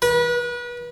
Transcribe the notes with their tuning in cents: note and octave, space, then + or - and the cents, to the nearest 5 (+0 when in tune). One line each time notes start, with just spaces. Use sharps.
B4 -35